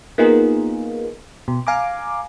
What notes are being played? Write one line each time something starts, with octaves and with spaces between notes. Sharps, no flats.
A#3 B3 D#4 F4 G#4 A#4
B2
F5 G#5 A#5 D6